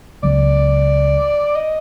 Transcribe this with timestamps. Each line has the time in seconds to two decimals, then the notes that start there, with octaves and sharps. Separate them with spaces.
0.23 C#2 C#3 F#3 B3 D5
1.56 D#5